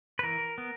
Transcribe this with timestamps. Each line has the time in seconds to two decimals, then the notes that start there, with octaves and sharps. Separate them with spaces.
0.19 B4
0.23 E3 A#4
0.58 B3